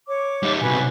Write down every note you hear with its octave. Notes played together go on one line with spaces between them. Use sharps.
C#5 D6
G3 D#4
B1 C3 F#4 B4 G#5